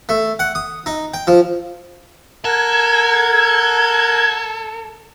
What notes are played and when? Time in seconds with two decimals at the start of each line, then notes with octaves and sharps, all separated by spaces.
0.09 A3
0.39 F#5
0.55 D#6
0.86 D#4
1.14 G5
1.27 F3
2.45 A4 A#4 F#5 G#6